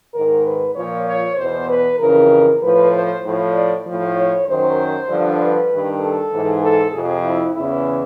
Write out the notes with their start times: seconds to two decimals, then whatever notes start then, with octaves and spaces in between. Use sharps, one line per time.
0.14 G#2 D#3 A#4
0.46 B4
0.76 A#2 F3 C#5
1.06 C#5
1.37 E2 B2 C5
1.69 B4
1.99 F2 C#3 E3 A#4
2.61 A2 F3 B4
2.92 C5
3.23 A2 F3
3.53 D5
3.85 A2 F3
4.16 C#5
4.47 F#2 D#3 C5
5.08 G2 D3 F3
5.39 B4
5.70 G2 D#3
6.00 A4
6.31 G#2 E3
6.62 A4
6.92 F2 C3 F3 G#4
7.24 E4
7.55 E2 C#3 E3 E4